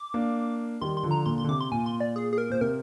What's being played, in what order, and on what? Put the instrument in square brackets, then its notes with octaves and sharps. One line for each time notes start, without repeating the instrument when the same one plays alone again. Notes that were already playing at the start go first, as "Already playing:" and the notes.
Already playing: [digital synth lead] D6
[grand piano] A#3 D4
[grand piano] D#3 G3 [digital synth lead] C6
[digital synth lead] C6
[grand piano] D3 F3
[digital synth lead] A#5
[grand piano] A#2 D3 [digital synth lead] C6
[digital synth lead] C6
[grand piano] D3
[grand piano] C3 [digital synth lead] D6
[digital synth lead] C6
[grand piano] A#2 [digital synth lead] G#5
[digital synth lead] C6
D5
G#4
G#4
A#4
[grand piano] A#2 [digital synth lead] C5
[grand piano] C3 [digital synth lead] A#4